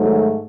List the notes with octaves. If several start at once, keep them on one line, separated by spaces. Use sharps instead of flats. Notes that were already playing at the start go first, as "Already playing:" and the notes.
Already playing: G#2 D#3 F#3 A3